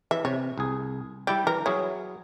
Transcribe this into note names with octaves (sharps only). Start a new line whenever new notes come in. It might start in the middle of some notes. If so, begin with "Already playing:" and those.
E3 E5
C3 C#5
C2 G#4
G3 E4 G4 D5
E3 A#4
F#3 E4 G#4 C#5